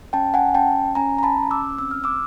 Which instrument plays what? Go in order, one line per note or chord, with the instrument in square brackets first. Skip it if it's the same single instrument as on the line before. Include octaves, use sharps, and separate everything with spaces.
[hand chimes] C#4 G5 A5
F#5 G#5
C#4 G5 A5
C#4 G#5 A#5
A#5
A5 B5
C#4
D6 E6
C4 E6
F6
D6 E6